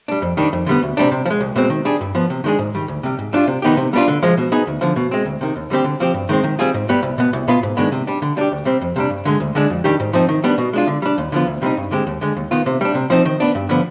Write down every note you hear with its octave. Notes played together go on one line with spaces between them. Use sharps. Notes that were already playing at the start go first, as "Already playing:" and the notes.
G3 D4
F2
D#3 G3 D4
F2
D3 G3 B3
D2
C3 G3 D4
C3
F3
G#3
C2
B2 G#3 C4
D#3
G3 D4 G#4
G2
F3 B3
C3
D#3 G#3 D4 G#4
G#2
D#3 G3
D2
C3 G3
G#2
G3 D4 F4
C3
D#3 B3 D#4 G4
C3
G3 B3 D4 F4
D3
F3 G#3
B2
B3 D#4 G#4
D2
D3 F3
B2
G#3 C4
D2
C3 D#3
D#2
D3 G3 C4 G4
D3
F3 C4 G4
G2
D#3 G#3 C4
D#3
G3 C4 F4 G#4
G#2
G3 B3
C2
B2 B3
C2
B2 B3 F4
G#2
D#3 G#3 B3 D4
C3
G3 D4
D3
G3 D4 G4
D2
C3 G3 C4
F2
C3 G3 D4
G2
D3 G#3
D2
D3 G#3 D4
F2
D#3 G3 D4 G4
G#2
F3 C4 D#4
D#3
G3 B3 D4
B2
G#3 D4 F4
D3
G3 D4
D#2
D3 F3 B3 F4
D2
C3 G3 C4 D#4
G2
D3 G#3 C4 G4
D#2
D3 G#3
D#2
D#3 B3 F4
C3
G3 D4
C3
F3 C4 D#4
D#3
B3 D4
G2
D3 F3 B3